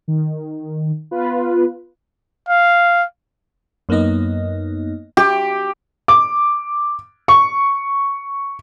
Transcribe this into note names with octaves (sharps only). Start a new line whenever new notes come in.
D#3
B3 F4 B4
F5
F#2 A#3 B3 D#4 D#5
G4
D6
C#6